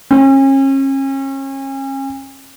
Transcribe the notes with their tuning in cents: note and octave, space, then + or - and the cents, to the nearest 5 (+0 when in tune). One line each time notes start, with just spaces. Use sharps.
C#4 -35